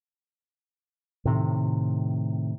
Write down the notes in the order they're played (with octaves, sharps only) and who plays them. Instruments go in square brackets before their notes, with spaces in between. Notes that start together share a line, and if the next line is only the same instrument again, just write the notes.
[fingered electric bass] A2 C3 D#3